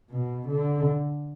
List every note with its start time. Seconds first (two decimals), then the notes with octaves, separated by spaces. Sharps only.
0.10 B2
0.48 D3